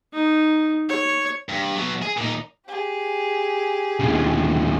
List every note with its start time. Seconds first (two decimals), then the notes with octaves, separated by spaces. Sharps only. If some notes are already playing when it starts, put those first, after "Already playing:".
0.13 D#4
0.89 C#5
1.49 G2
1.75 F#3 B3
2.02 G#4
2.17 A#2 D#4
2.66 G4 G#4
4.00 D#2 C#3